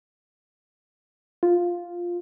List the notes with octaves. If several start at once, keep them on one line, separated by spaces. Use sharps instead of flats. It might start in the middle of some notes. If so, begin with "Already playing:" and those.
F4